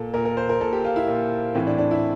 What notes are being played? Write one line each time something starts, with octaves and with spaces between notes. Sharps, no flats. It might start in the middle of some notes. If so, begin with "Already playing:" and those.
Already playing: A#2 A4
A#2 A#4
A#4
C5
A#4
A#2 A4
G4
F4
E4
A#2
A2 E3 C4
D4
D4
E4